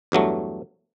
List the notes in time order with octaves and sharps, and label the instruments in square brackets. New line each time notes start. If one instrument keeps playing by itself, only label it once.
[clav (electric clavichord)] E2 G2 F#3 A3